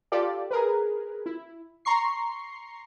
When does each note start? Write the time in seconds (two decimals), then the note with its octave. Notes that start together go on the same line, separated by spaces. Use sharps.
0.12 F4 G4 A4 D5
0.51 G#4 A#4 B4
1.26 E4
1.85 A#5 C6 C#6 C7